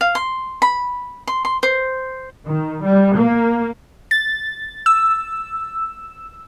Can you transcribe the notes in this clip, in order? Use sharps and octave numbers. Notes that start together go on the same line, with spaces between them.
F5
C6
B5
C6
C6
C5
D#3
G3
A#3
A6
E6